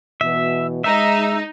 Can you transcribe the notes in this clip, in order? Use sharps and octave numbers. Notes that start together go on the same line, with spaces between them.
B2 E3 E5
G#3 D#4 E5